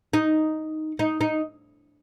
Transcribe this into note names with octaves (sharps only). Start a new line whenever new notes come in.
D#4
D#4
D#4